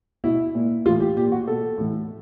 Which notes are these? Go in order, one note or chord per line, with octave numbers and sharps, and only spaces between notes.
B2 E4
A#2
A2 E3 F4
G4
A#2 G4
F#4
B2 A4
A2 E3